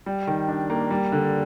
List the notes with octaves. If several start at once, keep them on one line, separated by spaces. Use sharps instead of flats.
G3
D#3
D4
A#3
G3
D3